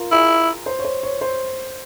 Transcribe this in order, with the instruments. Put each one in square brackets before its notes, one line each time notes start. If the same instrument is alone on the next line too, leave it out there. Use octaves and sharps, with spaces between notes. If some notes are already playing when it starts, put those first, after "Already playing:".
Already playing: [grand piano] F4 A#4
[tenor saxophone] E4 [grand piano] G#4
[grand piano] C5
C#5
C5
C#5
C5